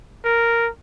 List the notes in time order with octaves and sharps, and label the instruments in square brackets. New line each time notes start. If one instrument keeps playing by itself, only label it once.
[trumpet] A#4